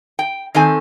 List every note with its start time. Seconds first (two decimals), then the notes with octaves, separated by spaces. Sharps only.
0.19 G5
0.55 D#3 C4 A4 G#5